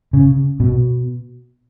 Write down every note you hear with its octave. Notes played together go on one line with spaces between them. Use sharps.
C#3
B2